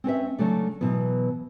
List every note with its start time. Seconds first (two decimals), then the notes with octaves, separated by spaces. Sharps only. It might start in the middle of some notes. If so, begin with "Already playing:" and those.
0.04 C4 C#4 B4 E5
0.38 C#3 F#3 A3 D4
0.81 B2 E3 F#3 B3